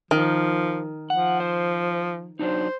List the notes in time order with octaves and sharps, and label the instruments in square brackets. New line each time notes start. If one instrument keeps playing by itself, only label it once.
[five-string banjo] D#3 [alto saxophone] F3
[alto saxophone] F3 [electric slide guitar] F#5
[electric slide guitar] C5
[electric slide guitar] F#3 D4 D#4 [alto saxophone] C5